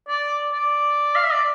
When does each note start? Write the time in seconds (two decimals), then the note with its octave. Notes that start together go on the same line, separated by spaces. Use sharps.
0.08 D5
0.52 D5
1.15 F5
1.23 E5
1.32 D5